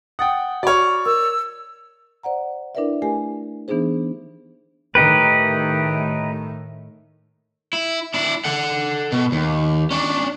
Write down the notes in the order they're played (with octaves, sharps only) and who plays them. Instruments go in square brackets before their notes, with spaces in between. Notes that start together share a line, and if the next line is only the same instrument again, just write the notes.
[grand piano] F#5 G5 [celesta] D#6 A6
[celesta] F#4 B5 F6 [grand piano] C#5 D5
[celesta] A#4 [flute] E6
[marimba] C5 D5 F#5 A#5
D4 E4 A#4 B4 D5 E5
A3 G4 A#4 G#5
E3 B3 D4 D#4 G#4 C5
[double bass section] A2 D#3 A3 [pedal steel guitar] D#4 G4 B4
[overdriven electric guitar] E4
D4 E4
A4 F#5
B2
D#2
C#4 D4